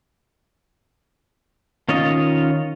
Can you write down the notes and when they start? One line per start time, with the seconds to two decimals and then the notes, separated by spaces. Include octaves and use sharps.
1.89 D#3 C#4 F4 C#5 D#5